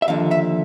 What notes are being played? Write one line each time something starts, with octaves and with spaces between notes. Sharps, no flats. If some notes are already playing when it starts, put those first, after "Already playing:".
E5
D#2 D3 F3 F5
E5